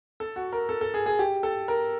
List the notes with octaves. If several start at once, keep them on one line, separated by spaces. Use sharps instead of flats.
A4
F#4
A#4
A4
A4
G#4
G#4
G4
A4
A#4